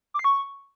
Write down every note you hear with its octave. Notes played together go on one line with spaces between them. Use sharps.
D6
C7
C#6